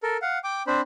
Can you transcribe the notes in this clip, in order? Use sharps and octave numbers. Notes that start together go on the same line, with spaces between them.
A4 A#4
F5 F#5
G5 D6
C4 D4 C5 B5